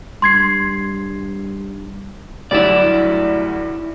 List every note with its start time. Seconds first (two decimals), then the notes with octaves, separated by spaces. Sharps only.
0.22 G2 C6 G#6 C7
2.51 D2 G2 F#3 E4 D5